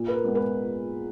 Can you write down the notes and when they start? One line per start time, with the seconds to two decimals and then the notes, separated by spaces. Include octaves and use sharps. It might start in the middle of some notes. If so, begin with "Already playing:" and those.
Already playing: A#2
0.08 B4
0.14 A#4
0.24 G#3 B3
0.35 B4